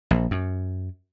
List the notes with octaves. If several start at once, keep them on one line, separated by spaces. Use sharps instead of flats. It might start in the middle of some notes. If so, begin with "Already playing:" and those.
A#1
F#2